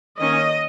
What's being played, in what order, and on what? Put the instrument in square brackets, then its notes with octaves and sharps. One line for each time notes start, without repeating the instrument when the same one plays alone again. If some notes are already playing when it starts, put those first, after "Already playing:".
[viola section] D#3 A#3 C#4 D#5